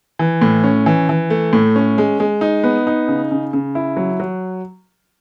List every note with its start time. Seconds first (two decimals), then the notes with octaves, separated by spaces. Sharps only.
0.19 E3
0.42 A2
0.64 C#4
0.86 E3
1.09 E3
1.30 A3
1.53 A2
1.76 C#4
1.98 G#3
2.20 G#3
2.41 D#4
2.64 B3
2.87 D#4
3.08 C#3
3.31 C#3
3.53 C#3
3.75 E4
3.97 F#3
4.20 F#3